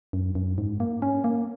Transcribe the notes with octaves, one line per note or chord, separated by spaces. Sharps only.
F#2
F#2
G#2
A#3
C#4
A#3